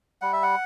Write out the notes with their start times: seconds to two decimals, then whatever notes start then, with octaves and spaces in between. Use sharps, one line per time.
0.21 G3 F#5
0.33 E5
0.43 F#5